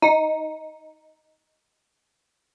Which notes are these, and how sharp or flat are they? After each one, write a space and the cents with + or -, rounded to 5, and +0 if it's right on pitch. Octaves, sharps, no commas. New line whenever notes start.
D#4 +10